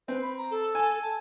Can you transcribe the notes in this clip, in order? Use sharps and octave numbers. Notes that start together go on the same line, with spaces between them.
C4 B4
B5
A#5
A4
G#5
A5